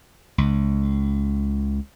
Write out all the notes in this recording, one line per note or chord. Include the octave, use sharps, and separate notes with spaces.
C#2